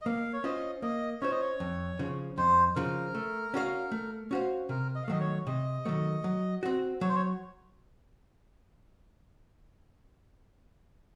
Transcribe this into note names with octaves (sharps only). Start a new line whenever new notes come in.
D#5
A#3 F5
C#5
C#4 F4 C5 D#5
A#3 D#5
C#4 F4 C5 C#5
D#5
C#5
F2
C#3 F3
F2 C5
C#3 F3 A#4
A3
C#4 F#4 C5 F5
A3
C#4 F#4 C5 F5
C3 A#4
D#5
F5
D#3 F#3 A3 D#5
C#5
C3 D#5
D#3 F#3 A3
F#3
C4 F#4
F#3 C#5
C5
C#5